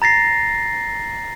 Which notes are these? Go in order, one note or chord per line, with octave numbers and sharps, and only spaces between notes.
A#5 A6 A#6 C7